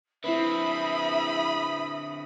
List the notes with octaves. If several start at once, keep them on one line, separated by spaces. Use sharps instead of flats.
D3 C4 E4 B4 E5 B5 D#6